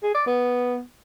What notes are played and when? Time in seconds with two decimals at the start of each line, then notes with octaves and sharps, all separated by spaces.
0.03 G#4
0.15 D5
0.27 B3